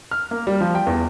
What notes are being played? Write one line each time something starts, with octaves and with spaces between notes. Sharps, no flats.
F6
A#3
G3
F3
G5
E2